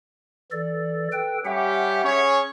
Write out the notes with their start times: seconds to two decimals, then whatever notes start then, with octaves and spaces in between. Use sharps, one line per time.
0.52 E3 A4 D5
1.12 A4 B4 G5
1.45 G3 C#4 G4 E5 F#5
2.04 C#4 G#4 C#5